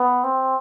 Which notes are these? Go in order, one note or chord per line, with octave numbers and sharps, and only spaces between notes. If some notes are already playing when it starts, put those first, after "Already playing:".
Already playing: B3
C4